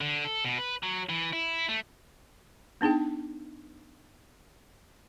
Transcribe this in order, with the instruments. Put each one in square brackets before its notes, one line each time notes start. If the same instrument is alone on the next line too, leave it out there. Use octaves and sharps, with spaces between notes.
[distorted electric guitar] D3
A4
B2
B4
F#3
E3
E4
A3
[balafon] B3 D4 D#4 G#4 G5